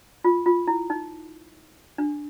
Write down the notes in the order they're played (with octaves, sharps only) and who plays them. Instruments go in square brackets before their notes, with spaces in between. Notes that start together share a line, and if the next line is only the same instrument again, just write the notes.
[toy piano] F4
F4
E4
D#4
D4